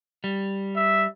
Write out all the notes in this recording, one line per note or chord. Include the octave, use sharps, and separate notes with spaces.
G3
E5